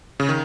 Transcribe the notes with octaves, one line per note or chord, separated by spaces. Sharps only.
C#3
D#3